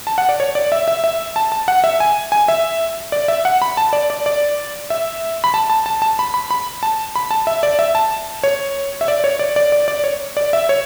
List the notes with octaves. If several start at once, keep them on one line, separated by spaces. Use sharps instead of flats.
A5
F#5
D5
C#5
D5
E5
E5
E5
A5
A5
F#5
E5
G#5
G#5
E5
D5
E5
F#5
B5
A5
D5
D5
D5
E5
B5
A5
A5
A5
A5
B5
B5
B5
A5
B5
A5
E5
D5
E5
A5
C#5
E5
D5
C#5
D5
D5
D5
D5
C#5
D5
E5
C#5